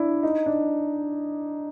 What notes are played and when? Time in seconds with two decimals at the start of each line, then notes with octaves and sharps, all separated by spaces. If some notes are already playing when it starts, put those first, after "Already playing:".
Already playing: D4 E4
0.23 D#4
0.46 D4